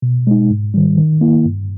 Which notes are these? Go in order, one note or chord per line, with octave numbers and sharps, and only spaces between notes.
B2
G#3 D#4
G#2
D#3 G3
D#3
A#3 E4
G2